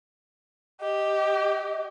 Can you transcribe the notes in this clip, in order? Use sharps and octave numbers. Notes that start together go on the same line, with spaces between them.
G4 D#5